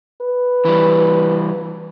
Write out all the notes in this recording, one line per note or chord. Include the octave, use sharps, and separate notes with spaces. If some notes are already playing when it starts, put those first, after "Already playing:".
B4
E3 G3